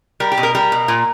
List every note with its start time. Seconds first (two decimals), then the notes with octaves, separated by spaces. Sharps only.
0.20 G3 A#4
0.32 G4
0.37 B2
0.43 A#4
0.55 G3 A#4
0.72 B2
0.88 A#2